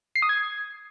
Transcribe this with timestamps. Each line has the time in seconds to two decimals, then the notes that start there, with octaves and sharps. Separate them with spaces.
0.16 C7
0.22 D#6
0.29 G#6